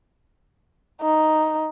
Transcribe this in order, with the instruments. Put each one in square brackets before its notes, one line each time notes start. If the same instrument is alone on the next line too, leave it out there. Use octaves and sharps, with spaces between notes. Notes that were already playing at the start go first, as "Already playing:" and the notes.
[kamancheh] D#4